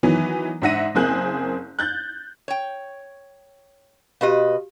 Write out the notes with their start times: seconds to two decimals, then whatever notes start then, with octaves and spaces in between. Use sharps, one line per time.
0.03 D#3 E3 F#3 B3
0.62 G#2 D4 E5 F#5 A#6 D#7
0.95 F#1 A#3 C4 G#4 F#6 G6
1.79 F#6 G6 A6
2.48 C#5 G5
4.21 B2 F#4 G4 B4 D#5 F5